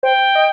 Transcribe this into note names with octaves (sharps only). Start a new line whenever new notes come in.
C5 G5
D#5